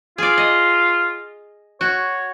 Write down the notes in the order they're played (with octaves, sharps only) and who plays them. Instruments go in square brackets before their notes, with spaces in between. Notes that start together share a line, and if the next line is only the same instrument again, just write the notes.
[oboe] F4 [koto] G#4 D5
[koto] D#5
[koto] F#4 [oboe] C#5